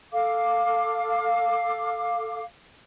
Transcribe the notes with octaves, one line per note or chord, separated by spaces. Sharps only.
A4 F5 D6